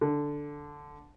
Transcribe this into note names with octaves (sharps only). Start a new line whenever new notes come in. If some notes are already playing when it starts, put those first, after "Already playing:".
D3